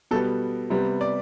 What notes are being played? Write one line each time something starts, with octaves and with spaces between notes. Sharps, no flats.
B2 G3 B3 A4
C3 G3 B3
D5